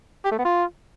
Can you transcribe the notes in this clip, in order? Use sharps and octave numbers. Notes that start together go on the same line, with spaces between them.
G4
A3
B3
F4